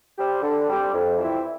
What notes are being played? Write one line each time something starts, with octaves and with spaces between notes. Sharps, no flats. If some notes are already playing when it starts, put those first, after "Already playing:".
G3 C4 G4
D3
G3 C4 G4
F2
E3 G3 C4 E4